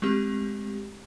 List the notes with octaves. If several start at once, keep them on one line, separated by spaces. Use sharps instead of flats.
G#3 A3 C4 G4